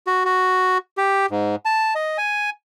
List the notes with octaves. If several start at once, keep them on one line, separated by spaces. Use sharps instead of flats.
F#4
F#4
G4
G#2
A5
D#5
G#5